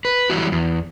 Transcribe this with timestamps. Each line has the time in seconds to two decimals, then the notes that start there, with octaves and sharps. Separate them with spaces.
0.05 B4
0.30 E3 F#3 G3 E4 F#4
0.52 E2